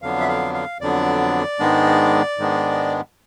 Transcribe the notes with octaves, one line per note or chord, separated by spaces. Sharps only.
F2 D3 F#3 B3 D4 F5
E5
F5
F5
F2 D3 F#3 B3 D4 D5
G#2 D#3 G#3 B3 D4
G#2 D#3 G#3 B3 D4